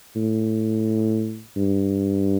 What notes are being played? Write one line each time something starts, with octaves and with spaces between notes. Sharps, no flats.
A2
G2